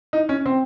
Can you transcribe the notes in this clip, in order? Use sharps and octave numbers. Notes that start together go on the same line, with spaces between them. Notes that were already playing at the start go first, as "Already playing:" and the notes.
D#4
C#4
C4